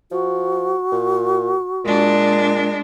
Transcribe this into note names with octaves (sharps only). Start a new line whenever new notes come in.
F3 F#4
A#2
A#2 G#3 D4